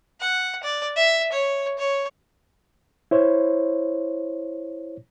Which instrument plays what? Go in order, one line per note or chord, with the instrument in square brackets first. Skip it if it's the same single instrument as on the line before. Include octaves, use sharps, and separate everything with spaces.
[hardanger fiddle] F#5
D5
E5
C#5
C#5
[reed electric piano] E4 C5 C#5